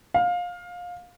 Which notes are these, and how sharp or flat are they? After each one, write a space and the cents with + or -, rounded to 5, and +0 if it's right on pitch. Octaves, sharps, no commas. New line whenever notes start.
F5 +20